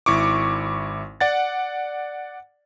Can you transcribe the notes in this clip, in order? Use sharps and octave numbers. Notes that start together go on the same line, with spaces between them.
G#1 E4 C#6 D6
D5 F#5 A6